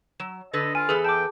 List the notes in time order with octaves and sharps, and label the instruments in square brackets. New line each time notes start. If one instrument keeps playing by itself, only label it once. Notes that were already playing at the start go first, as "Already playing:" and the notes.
[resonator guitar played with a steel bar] F#3 [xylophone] E7
[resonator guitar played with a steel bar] D3 A4 B4 [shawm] D#5
[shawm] F4 [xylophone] G#5 D7
[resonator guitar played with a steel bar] E2 A4 B4 [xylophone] G#4
[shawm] G5 [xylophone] A5 D6